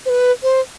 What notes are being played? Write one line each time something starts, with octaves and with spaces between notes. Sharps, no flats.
C5
B4
C5